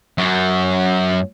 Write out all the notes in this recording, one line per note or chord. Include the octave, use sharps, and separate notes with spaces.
F#2 F#3